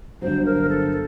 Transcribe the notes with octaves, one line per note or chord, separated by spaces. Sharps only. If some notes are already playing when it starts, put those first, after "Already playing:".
G1 G2 F#3 C5
A#4
A4